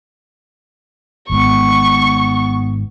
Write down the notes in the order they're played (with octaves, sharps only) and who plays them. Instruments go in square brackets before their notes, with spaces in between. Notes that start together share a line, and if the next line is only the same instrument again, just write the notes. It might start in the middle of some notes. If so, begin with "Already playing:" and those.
[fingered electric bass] G#1 G#2 [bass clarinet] B3 [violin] C#6